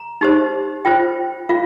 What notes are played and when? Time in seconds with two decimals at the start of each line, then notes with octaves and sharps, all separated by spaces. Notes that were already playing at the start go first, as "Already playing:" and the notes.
Already playing: A#5
0.21 D#4 G4 C5
0.85 F4 C5 G5
1.49 F4 F5